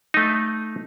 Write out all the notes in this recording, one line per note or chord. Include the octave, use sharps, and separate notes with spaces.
A3 D#4